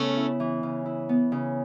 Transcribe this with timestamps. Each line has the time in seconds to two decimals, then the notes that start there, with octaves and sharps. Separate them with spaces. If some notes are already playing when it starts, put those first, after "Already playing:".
Already playing: C#3 A3 B3 C#4
0.17 E4
0.40 E3
0.63 C#3
0.86 E4
1.09 B3
1.32 C#3